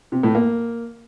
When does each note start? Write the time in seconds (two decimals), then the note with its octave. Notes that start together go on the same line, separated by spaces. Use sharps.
0.12 C3
0.23 A2
0.35 A#3